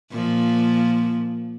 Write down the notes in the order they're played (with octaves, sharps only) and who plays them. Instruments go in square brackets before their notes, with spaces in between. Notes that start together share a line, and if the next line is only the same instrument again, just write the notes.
[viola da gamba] A#2 F3